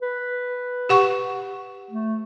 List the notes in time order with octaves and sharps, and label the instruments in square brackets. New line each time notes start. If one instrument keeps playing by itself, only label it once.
[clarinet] B4
[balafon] G4 F#5 C#6
[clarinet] A3